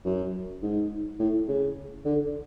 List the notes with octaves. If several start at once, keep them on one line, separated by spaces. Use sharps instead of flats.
F#2
G#2
A2
C#3
D3